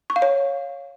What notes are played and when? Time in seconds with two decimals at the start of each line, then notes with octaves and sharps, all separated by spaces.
0.10 C#6
0.16 F5
0.22 C#5